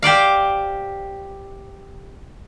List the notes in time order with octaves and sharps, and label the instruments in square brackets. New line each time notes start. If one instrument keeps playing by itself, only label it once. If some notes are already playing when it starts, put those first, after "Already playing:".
[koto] G4 C5 D5 F5